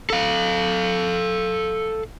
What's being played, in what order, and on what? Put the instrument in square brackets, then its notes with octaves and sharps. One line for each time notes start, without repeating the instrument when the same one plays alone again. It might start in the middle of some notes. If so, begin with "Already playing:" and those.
[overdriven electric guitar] A4 F5